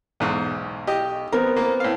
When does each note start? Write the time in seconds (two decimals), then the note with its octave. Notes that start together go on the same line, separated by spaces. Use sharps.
0.20 B1 E2 G#2
0.87 G4 D#5
1.32 B3 C4 A#4
1.56 A#3
1.80 A2 F5